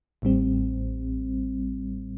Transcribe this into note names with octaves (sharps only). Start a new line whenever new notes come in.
A1 A2 G3 C4